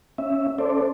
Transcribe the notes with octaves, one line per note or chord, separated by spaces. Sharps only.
C#4 E5
C#4 A4 C5 D5